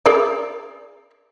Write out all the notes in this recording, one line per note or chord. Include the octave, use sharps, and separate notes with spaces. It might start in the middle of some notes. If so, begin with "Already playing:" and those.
G#4 A#4 D5